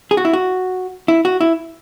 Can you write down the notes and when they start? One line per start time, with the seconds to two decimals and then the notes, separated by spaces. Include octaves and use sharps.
0.11 G#4
0.17 F#4
0.25 E4
0.33 F#4
1.08 E4
1.25 F#4
1.41 E4